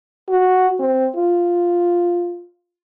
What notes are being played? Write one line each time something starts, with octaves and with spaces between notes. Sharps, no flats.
F#4
C4
F4